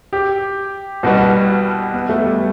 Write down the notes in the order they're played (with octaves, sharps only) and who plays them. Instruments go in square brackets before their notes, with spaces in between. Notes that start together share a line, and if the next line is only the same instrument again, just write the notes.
[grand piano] G4
[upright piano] C2 B2 G3 B3 [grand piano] F#4
[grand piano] B3
A3
G3